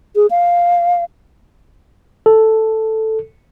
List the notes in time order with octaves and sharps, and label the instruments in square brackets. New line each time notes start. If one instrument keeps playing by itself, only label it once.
[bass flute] G#4
F5
[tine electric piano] A4